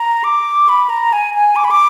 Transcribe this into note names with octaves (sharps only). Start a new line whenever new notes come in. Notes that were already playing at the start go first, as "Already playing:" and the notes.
Already playing: A#5
D6
B5
A#5
G#5
G#5
D6
B5
D6